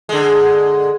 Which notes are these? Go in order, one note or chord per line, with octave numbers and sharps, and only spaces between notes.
D3 G#3